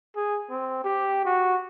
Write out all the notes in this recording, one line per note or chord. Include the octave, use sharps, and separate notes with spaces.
G#4
C4
G4
F#4